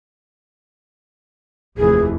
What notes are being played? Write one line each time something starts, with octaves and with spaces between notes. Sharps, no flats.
F1 D#2 E3 G#4